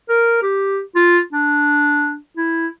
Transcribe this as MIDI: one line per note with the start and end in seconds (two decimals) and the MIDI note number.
0.09 0.40 70
0.43 0.80 67
0.95 1.19 65
1.33 2.17 62
2.37 2.67 64